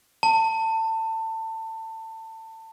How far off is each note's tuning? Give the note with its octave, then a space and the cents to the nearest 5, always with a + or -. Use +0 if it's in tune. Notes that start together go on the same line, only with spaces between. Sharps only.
A5 +25